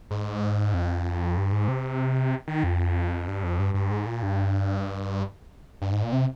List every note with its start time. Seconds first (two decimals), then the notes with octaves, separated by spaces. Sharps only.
0.11 G#2
0.74 F2
1.38 G2
1.52 G#2
1.68 C3
2.48 D#3
2.64 F2
3.28 G2
3.44 F2
3.59 G2
3.74 G2
3.91 G#2
4.06 A#2
4.23 G2
5.82 G2
5.92 G#2
6.03 A#2
6.12 C3